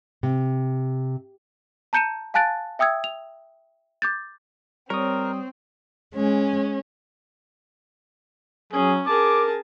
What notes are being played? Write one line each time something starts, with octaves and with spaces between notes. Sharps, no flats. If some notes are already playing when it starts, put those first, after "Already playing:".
C3
A5 A#5 G6 C#7 D#7 E7
F5 G#5 A5 F#6 A6 D7
E5 G5 D#6 E6 G#6
F7
D6 G6 A6
G3 C4 A#4 C#5 D#6
G#3 C#4
F#3 C#4 G#4
G#4 A#4 A5 D6